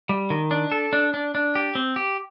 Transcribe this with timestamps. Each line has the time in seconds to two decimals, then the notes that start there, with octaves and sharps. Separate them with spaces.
0.09 G3
0.30 D#3
0.51 D4
0.72 A4
0.93 D4
1.14 D4
1.35 D4
1.55 G4
1.75 C4
1.96 G4